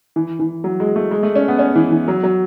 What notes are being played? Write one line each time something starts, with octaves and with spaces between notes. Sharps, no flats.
E3
E3
F#3
G#3
A3
G#3
A3
C#4
B3
C#4
E3
E3
F#3
F#3